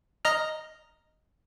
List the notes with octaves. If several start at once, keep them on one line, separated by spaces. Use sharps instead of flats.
D#5 A#5 F6